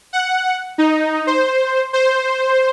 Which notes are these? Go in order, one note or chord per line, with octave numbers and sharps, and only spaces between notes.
F#5
D#4
C5
C5